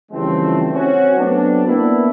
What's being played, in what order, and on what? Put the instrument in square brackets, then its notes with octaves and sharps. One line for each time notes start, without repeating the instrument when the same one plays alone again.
[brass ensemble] C#3 E3 F3 G3 A3 C4
C4 C#4 F#4
F#3 A3 B3 C4 D4
A#3 B3 D4 E4